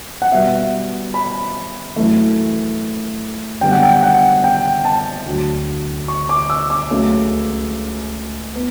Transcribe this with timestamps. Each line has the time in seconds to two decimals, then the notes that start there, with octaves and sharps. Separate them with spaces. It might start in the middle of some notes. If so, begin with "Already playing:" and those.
0.22 F#5
0.32 B2 G3 B3 E5
1.14 B5
1.96 F#2 E3 A3
3.61 F#2 D3 G3 B3 G5
3.71 F#5
3.83 G5
4.03 F#5
4.44 G5
4.85 A5
5.26 D2 D3 F#3
6.08 C#6
6.29 D6
6.50 E6
6.70 D6
6.91 C#2 C#3 F#3 A3
8.55 B3